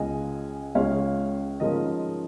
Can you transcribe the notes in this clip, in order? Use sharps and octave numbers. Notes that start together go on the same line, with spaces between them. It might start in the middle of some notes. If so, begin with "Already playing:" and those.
Already playing: C#2 C#3 G#3 D#5 G#5
C#2 C#3 G#3 C#5 F5
G#2 F3 G#3 C#4 A#4 D#5